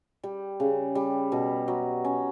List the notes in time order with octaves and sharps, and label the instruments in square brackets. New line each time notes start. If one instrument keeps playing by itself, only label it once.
[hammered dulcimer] G3
C#3
G3
B2
F#3
C#4